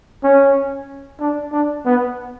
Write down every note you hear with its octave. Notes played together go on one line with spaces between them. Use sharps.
C#4
D4
D4
B3